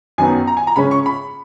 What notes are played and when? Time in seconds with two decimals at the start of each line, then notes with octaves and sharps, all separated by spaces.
0.18 F#2 D#3 F#3 B3 D#4 G#5
0.47 A#5
0.57 G#5
0.67 A#5
0.76 C#3 G#3 C#4 B5
0.91 C#6
1.06 B5